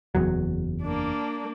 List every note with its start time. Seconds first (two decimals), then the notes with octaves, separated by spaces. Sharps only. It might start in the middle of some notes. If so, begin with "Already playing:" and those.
0.15 F#1 E2 F#3
0.83 A#3 D4